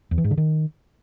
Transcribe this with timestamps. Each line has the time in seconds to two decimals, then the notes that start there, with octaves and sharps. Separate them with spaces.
0.11 E2
0.18 E3
0.24 G#2
0.31 D3
0.37 D#3